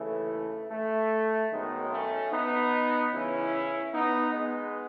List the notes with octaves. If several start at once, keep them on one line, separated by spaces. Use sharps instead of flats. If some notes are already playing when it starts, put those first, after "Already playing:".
Already playing: D#2 C#3 E3 A3
A3
F#2 D#3 F#3 G#3 B3
A3 C#4
B3 D#4
C#2 C#3 E3 C#4 E4
B3 D#4
G#3 B3